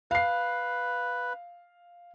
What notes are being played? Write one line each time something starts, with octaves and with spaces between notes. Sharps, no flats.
B4 F5 C7